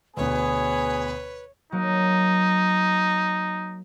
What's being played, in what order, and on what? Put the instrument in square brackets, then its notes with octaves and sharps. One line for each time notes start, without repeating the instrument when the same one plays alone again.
[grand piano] D2 B2 [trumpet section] B3 G#4 [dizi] B4 [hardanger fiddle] C#5
[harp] F#3 A#3 [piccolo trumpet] D#4